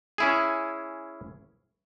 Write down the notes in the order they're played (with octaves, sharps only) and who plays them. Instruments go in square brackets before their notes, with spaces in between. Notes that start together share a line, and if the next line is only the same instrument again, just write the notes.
[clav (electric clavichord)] C#4 E4 G#4